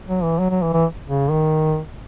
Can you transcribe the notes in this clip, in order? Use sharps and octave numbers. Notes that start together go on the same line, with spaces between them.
F#3
E3
F#3
F#3
E3
E3
C#3
D#3